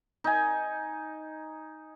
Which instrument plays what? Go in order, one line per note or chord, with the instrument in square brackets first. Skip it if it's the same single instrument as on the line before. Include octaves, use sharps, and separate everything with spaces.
[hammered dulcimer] D#4 G#5